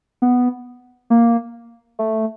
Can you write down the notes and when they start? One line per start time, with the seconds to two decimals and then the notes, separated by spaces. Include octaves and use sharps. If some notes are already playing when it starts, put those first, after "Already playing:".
0.22 B3
1.10 A#3
1.99 A3